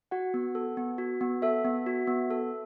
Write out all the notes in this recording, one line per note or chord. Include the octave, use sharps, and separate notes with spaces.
F#4 F#5
B3
A4
B3
F#4
B3
A4 E5
B3
F#4
B3
A4